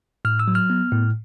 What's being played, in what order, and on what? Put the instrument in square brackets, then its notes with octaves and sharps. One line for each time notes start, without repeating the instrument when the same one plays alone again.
[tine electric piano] A2 F6
E6
F#3
F6
B3
A2